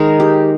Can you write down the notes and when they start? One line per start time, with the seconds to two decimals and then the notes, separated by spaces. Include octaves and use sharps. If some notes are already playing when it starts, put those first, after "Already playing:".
Already playing: D#3 G#3 A#4
0.20 G4